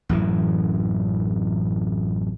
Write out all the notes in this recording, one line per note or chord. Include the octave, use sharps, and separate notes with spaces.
A1 F#2 E3